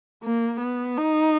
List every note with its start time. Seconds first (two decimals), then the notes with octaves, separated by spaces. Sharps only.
0.23 A#3
0.61 B3
0.98 D#4